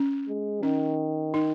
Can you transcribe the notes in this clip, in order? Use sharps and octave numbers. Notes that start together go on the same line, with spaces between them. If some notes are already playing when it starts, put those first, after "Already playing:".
Already playing: C#4
G#3
D#3 C#4
D#4